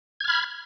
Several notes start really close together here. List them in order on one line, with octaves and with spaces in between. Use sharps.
G#6 F6 B5